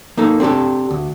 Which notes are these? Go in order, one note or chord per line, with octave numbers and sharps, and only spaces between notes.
A#3 D#4 A4
C4 D4 F#4 G4 A4
D2